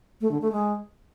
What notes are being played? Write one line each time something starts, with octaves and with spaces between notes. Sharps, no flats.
A3
D3
A3
G#3